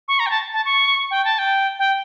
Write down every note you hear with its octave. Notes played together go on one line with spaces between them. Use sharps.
C#6
A#5
G5
A5
A5
C#6
G5
A5
G5
G5